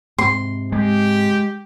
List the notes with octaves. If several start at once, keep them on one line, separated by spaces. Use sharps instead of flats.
G#2 C3 C6
G#3 G4